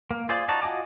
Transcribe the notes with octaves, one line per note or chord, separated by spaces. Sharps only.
A#3
F4 G#4 C5 D5
D#4 F#4 D5 A5
F4 F#4 D#5 G#5 D6